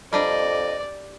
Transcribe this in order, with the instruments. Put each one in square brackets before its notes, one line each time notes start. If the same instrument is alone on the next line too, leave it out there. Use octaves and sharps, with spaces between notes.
[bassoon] F2 [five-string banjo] G3 D4 A#5 [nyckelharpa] D5 [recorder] D#5